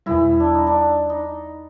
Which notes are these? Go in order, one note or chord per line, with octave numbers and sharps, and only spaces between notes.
E2 B2 G3 E4
D4
D#4
D4
D#4